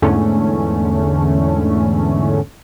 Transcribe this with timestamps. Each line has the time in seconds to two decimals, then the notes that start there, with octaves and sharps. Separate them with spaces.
0.02 E2 G#2 D3 A3 C#4